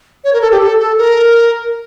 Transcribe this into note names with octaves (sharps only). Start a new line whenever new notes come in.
C#5
A#4
A4
G4
A4
A4
A#4